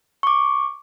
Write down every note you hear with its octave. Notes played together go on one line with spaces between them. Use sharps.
C#6 D6